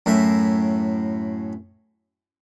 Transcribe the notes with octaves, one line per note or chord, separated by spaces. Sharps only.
F#2 A2 E5